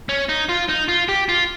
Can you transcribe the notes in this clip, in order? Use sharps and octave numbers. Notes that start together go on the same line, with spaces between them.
C#4
D#4
F4
D#4
F4
G4
F4